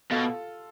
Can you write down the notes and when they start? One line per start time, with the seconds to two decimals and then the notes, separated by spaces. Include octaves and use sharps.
0.11 B2 F4 A4